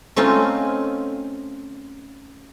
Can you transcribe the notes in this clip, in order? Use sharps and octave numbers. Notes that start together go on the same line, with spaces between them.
A3 C4 C#4 D#4 F4